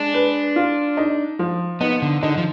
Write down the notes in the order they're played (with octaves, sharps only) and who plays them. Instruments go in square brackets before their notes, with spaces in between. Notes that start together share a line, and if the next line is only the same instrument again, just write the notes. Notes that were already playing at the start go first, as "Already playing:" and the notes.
Already playing: [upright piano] G#3 [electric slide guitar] D4
[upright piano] B4
F4
D#4
F3
[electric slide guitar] B3 [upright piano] D#4
[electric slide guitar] D3
[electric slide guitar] D3 [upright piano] D#4
[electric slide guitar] F3